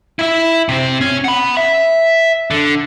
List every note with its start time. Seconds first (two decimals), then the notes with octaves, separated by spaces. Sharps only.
0.19 E4 E5
0.69 C3 C4
1.01 C#4
1.24 F#5 B5
1.57 E5
2.51 D3